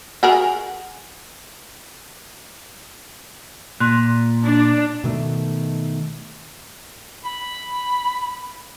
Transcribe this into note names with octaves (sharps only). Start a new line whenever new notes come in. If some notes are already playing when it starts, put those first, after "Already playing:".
F#4 G#4 A#4
A#2 C6 F#6
D4
B2 D#3 A3
B5